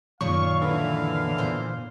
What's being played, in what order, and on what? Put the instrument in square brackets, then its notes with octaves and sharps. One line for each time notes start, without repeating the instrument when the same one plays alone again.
[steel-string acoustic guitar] F#2 A#2 D#3 [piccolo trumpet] F5 [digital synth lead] C#6
[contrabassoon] D3 [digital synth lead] E3
[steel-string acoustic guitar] A#2 C5